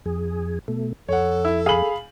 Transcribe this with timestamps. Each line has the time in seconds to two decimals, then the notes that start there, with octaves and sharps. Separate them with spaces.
0.06 F2 G#4
0.68 B2 A3
1.08 F2 A4 C#5 F#5
1.45 E4
1.66 G#4 F5 B5 F#7